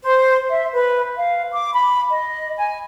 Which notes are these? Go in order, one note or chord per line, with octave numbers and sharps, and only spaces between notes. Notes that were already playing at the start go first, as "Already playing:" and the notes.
C5
E5
B4
F5
D6
B5
D#5
G#5